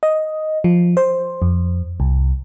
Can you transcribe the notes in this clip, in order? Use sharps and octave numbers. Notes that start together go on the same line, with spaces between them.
D#5
F3
C5
F2
C2